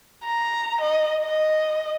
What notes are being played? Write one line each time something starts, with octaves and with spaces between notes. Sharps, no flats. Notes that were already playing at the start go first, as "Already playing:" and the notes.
A#5
D#5
D#5